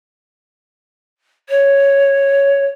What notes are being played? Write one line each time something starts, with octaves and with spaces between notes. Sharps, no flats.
C#5